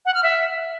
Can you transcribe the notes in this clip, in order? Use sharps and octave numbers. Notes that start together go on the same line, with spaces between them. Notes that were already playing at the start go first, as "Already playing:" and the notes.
F#5
F6
E5